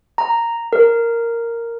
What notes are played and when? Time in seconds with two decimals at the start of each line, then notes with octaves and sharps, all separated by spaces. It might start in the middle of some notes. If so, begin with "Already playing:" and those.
0.18 A#5
0.73 A#4